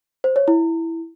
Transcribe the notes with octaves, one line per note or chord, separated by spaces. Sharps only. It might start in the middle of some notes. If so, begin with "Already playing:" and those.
C5
C#5
E4